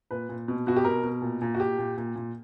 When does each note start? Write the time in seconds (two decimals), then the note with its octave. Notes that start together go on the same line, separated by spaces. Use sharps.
0.11 A#2 B4
0.29 A#2
0.48 B2
0.67 B2 F#4
0.76 G4
0.85 B2 A#4
1.04 B2
1.22 A#2
1.42 A#2
1.55 F#4
1.60 A#2 G4
1.79 A#2
1.97 A#2
2.16 A#2